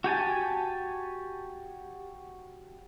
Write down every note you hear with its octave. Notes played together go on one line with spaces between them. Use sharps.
F#4 G4 G#5 A5